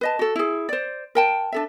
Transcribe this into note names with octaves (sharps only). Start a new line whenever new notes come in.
B4 D#5 A5
F#4 A4
E4 G#4
C5 D5
A#4 G5 A5
D4 A4 E5